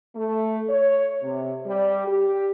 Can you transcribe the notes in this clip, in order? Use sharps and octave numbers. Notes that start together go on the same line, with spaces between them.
A3
C#5
C3
G3
G4